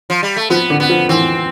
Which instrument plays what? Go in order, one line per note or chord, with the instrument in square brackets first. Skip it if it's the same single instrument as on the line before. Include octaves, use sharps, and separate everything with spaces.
[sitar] F3
G3
A3
[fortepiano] F3 [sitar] B3
[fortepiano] D3
[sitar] B3
[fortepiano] F3
[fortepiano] E3 [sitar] C4